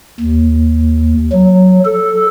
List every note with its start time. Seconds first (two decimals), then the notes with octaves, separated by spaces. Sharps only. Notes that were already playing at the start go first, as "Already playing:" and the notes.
0.20 D#2
1.32 F#3
1.85 A4